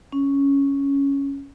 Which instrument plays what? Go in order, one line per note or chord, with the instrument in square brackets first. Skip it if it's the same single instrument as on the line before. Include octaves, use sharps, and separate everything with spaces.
[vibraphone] C#4